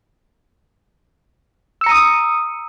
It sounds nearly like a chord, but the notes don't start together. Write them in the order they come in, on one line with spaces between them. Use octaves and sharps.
E6 C#7 A#5 D#7 D#6